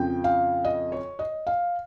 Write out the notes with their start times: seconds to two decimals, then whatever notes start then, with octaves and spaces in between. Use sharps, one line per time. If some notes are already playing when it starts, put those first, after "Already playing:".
Already playing: F2 C#3 F3 G5
0.24 F5
0.65 D#5
0.92 C#5
1.19 D#5
1.47 F5